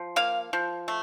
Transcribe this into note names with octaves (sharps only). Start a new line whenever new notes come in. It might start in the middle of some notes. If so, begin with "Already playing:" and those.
Already playing: F3
A#3 F5
F3
A3